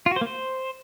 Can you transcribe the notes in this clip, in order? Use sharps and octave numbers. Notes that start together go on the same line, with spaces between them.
F4
F#4
C5
A#3
C5